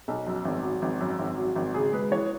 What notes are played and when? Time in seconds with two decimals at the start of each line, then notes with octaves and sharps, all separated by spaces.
0.08 B1
0.27 F#2
0.45 G#1
0.64 F#3
0.82 G#1
1.01 F#2
1.19 G#1
1.38 F#3
1.56 G#1
1.74 C#3 G#4
1.93 G#3 B4
2.11 E3 C#5